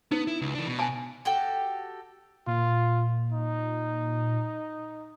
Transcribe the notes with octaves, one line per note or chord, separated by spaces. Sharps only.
B3 D#4
E4
C#2
E3 D4
B2
G#5 A5
F#4 G4 A4 G5
A#2 F4
D#4